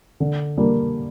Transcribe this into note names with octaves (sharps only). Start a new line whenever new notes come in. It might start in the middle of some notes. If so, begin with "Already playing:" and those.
D3
G3 A#3 D4